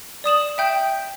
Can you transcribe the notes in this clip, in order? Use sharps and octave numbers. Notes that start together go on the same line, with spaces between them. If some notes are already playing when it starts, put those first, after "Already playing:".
D5 D#6 E7 F#7
E5 G5 G6